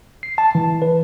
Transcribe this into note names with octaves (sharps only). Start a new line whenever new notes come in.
C7
A5
E3
B4